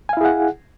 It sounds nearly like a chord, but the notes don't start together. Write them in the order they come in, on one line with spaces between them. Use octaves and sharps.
G#5 F5 E4 G#4 F#5